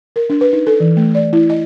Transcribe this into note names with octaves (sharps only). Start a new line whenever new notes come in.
A#4
D4
B4
D#4
A4
E3
A3
D5
E4
D#5